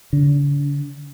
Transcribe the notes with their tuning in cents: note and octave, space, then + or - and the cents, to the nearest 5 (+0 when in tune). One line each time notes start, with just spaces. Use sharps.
D3 -45